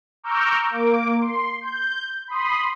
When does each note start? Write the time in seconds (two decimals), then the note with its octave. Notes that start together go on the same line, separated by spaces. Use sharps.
0.23 A#5 C#6 D6 E6 F6 G6
0.70 A#3 D6
1.20 C6
1.61 G6
2.28 B5 C6 D#6